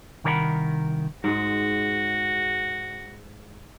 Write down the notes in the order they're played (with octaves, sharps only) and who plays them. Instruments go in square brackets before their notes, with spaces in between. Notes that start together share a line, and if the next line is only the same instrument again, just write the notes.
[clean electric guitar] C2 D#3 A#4 D5 F#5 B5
[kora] G#2 G#3 [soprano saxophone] F#4